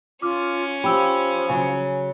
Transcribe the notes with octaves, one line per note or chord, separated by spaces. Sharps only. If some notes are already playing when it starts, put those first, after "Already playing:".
C#4 F4 D6 F6
F3 G4 B5 E6
C#3 F#3 G#5